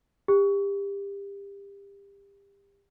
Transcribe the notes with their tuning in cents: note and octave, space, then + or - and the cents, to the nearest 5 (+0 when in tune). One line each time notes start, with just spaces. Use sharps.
G4 +30